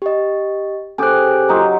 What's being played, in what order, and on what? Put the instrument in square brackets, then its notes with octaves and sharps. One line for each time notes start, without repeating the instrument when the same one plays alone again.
[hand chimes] G4 D#5
[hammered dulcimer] C#3 G4 [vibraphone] A4 C5 [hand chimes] G#5 F#6
[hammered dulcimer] F#3 D#4 F4